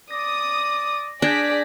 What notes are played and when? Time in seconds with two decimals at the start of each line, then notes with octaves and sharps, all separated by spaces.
0.11 D5 D#6 A#6
1.22 D4 G#4 D5 G6 G#6 A#6 B6